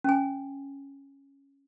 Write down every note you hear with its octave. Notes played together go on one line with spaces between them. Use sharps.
C#4 G#5